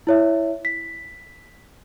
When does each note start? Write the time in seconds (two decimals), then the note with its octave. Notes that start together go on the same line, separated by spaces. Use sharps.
0.07 E4 C#5 E5
0.65 B6